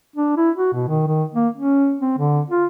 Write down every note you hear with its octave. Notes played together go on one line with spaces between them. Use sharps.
D4
E4
F#4
B2
D#3
D#3
A#3
C#4
C4
D3
F4